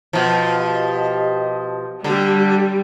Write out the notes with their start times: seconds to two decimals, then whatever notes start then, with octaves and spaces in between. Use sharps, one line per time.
0.13 B2 F3
0.57 G4 D#5
2.04 D3 G3